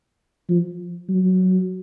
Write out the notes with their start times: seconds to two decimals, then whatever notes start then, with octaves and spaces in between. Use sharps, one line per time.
0.49 F3
1.09 F#3